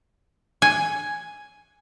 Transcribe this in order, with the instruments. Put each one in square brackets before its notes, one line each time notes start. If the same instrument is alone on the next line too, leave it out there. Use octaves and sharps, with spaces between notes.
[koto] G#5